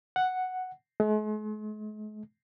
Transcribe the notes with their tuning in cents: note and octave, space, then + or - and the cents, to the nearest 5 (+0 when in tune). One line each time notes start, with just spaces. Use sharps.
F#5 +0
G#3 +45